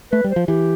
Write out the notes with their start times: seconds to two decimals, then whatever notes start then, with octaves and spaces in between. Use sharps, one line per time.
0.12 A3 B4
0.24 G3
0.30 C5
0.36 F3
0.48 E3 G4